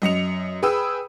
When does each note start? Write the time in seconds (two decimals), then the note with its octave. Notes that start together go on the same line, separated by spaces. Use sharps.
0.02 F#2 D#5 C#7 F7
0.62 G#4 B4 G5 B5 D#6 E6